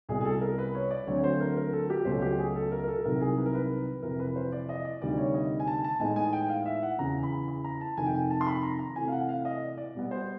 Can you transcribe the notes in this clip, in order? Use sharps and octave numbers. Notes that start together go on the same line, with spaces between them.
C2 B2 G3 G#4
G#4
A4
A4
A#4
B4
C#5
D5
D2 D3 F#3 A3 C4 C#5
C#5
C5
A#4
A#4
A4
G4
C#2 B2 F#3 A3 C#4 C5
G4
G#4
A4
A#4
A#4
A4
A4
C2 C3 D#3 F#3 A#4
G#4
B4
A#4
B4
F2 C3 E3 A#4
B4
C5
D5
D#5
D5
D2 C3 D#3 G3 D5
C#5
D#5
G#5
A5
A5
A2 E3 G#3 B3 D#4 G#5
G#5
G5
F5
E5
F#5
E2 C#3 E3 A#5
B5
B5
A#5
A5
F2 C3 D#3 G#5
G5
G#5
A5
C6
B5
A#5
A#5
C3 E3 A3 C4 E4 G#5
F5
F#5
F5
D#5
D5
D5
B2 G3 B3
C5